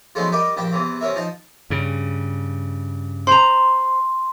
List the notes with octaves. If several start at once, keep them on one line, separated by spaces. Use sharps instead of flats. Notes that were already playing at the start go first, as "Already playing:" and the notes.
F3 F#3 G#3 A3 B3 D#4
G3 G4 A#4 D5 D#5
A#1 G2 G3 G5 A5
E2 C3 E3
C3 C#4 A#4 E5
F3 D#4 D#5 A5
G2 C#3
C5 A#5 C6